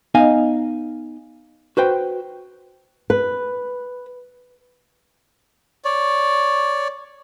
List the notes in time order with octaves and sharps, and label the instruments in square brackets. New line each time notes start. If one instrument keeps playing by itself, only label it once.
[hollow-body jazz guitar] B3 D#4 D#5 F5 G#5
F#4 B4 C5 G5
[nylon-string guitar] B4
[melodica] C#5 D5